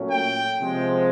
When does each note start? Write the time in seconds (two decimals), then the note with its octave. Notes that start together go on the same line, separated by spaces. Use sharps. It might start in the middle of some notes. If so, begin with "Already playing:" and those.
Already playing: A#2 F#3 A3 C#4
0.10 G5
0.61 C3 F3 G#3